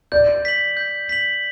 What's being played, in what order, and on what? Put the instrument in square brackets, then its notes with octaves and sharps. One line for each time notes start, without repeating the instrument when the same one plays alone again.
[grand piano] D5 [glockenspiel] G6
[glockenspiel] B6 F#7
G6
B6 F#7